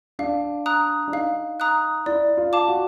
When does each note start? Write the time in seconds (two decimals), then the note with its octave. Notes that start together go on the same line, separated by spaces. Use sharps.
0.19 D4 F5
0.66 A#5 D#6 F#6
1.08 D4
1.12 D#4 F5
1.60 A#5 D#6 F#6
2.06 E4 D5
2.37 F4
2.53 F5 A5 D6
2.69 F#4